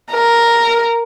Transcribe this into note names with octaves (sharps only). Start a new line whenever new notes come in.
A#4